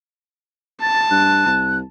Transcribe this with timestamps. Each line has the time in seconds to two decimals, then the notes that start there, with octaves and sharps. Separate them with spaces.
0.82 A5 A6
1.11 G2 F#6
1.46 C2